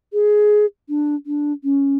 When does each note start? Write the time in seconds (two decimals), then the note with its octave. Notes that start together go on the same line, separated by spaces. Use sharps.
0.13 G#4
0.89 D4
1.26 D4
1.64 C#4